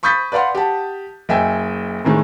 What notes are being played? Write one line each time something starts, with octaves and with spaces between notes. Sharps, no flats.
B5 C#6 D#6 G6 A6 B6
B4 D5 F5 F#5 C6
G4 F#5 A5
F#1 D#5 E5 G5 G#5
E2 A2 D#3 G#3